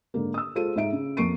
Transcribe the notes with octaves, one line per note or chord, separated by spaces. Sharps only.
G#2 D3 A#3
D#6 E6
G#3 F4 A4 C5 D#7
G#2 D#4 E5 D7
C#3
F2 A#3 C#6 C7 D7 D#7